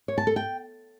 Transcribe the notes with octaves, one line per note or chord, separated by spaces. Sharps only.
C#5
A5
A4
G5